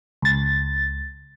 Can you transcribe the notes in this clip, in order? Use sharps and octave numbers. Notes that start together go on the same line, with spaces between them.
C#2 A6